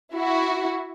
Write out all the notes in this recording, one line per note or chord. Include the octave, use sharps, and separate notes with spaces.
E4 F#4